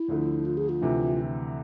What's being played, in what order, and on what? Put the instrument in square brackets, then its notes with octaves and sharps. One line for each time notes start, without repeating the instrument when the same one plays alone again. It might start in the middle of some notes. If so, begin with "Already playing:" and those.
Already playing: [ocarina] E4
[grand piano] D2 D3 F3 A3
[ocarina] F4
G#4
F4
[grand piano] D2 C3 E3